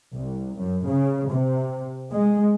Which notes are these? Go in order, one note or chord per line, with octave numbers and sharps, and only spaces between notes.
C2
F#2
C#3
C3
G#3